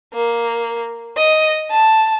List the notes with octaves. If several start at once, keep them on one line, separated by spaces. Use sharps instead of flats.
A#3
D#5
A5